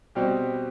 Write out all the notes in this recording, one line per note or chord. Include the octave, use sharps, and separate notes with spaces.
B2 G3 C4 G4